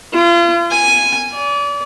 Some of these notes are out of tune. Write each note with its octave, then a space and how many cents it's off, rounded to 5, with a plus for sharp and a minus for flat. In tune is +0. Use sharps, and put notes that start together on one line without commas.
F4 -35
G#5 -5
D5 -35